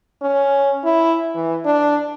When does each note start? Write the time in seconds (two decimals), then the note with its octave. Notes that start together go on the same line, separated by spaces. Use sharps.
0.22 C#4
0.85 E4
1.35 E3
1.65 D4